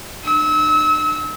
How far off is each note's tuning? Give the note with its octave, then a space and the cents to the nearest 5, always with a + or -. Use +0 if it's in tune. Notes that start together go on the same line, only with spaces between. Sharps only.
D4 +40 E6 -35